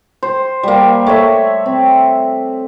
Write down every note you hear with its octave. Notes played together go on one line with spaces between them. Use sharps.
C5
G3 A#3
A3 C#5 E5
C4